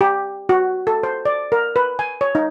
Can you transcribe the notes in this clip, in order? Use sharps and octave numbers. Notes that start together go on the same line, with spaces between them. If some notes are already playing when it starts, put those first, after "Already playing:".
G4
F#4
A4
C5
D5
A#4
B4
G#5
C#5
D#4